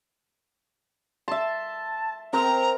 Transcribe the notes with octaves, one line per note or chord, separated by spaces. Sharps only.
E5 A5 C6
C4 A#4 A#5